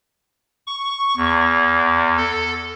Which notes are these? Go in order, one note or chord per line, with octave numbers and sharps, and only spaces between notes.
C#6
E2
A4